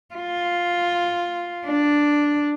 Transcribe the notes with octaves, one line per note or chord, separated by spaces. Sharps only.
F4
D4